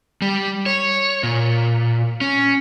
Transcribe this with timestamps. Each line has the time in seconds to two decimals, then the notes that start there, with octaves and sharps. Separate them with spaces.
0.22 G3
0.66 C#5
1.23 A#2
2.21 C#4